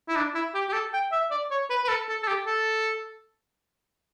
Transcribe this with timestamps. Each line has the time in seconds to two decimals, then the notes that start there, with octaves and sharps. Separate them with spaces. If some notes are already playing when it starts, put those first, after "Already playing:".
0.09 E4
0.16 D4
0.35 E4
0.55 G4
0.69 G4
0.73 A4
0.93 G5
1.12 E5
1.31 D5
1.51 C#5
1.70 B4
1.85 B4
1.89 A4
2.09 A4
2.23 A4
2.28 G4
2.47 A4